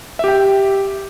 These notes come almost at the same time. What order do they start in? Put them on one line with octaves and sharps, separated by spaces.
E5 G4 G5